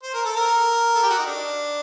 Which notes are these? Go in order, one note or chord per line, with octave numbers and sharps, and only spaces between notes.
C5
A#4
A4
A#4
A4
G4
F#4
D#4
D4